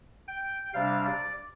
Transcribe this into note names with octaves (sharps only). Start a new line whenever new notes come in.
G5
C3 G3 D4 F5
D5